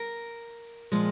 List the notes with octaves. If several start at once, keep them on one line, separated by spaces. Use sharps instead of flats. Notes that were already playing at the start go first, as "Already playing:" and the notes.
Already playing: A#4
A#2 F3 G#3